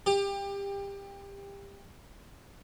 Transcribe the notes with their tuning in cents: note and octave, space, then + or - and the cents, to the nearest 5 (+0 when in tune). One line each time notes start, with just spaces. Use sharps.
G4 +25